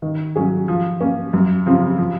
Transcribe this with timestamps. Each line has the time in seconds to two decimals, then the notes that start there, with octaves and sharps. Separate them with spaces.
0.02 D#3
0.36 F#3 C#4 G#4
0.68 F3
1.01 A#3 C#4
1.33 F#2
1.66 C#3 F3 C4
1.98 F3